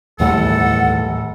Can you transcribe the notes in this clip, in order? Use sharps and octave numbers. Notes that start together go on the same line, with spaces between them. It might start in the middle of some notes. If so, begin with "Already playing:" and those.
D1 G1 D#2 A2 E3 A4 F#5